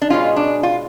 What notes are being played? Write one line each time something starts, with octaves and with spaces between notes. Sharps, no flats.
D4
B2 G#3 C#4 F4
D4
F4